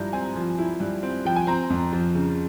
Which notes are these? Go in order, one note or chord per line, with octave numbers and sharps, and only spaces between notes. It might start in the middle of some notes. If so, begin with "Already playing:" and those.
Already playing: G2 F3 E4 A#5 G6
C4 G#5
F3
E4
G2
C4
F3 G5
G#5
C4 A#5
F2
F3
C#3